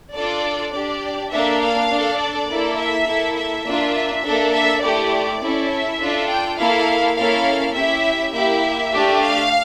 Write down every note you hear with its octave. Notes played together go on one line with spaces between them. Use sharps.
D4 F4 A4 D5
D4 G4 D5
A#3 D4 A4 E5
F5
D4 A4
D5
A#3 E4 A4
E5
A#3 E4 A4
E5
A#3 D4 F4
A#3 D4 A4
E5
A3 E4 G4 D5
C#4 E4 A4
E5
D4 F4 A4
G5
A#3 E4 A4 F5
A#3 C#4 E4 A4 F5
C#4 E4 G4 E5
A#3 E4 G4 E5
A3 D4 G4
F5